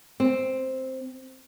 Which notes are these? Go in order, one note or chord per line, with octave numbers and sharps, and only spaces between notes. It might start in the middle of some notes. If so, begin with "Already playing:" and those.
C4